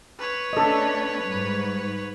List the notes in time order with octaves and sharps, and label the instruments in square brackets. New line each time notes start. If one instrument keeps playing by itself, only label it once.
[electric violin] B4 C#5
[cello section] A3 C#4 D4 [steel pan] A4 D#5
[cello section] G#2 G3